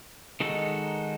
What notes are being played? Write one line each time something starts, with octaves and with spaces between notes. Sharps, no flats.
D#3 G#3 D#4 F#4 A4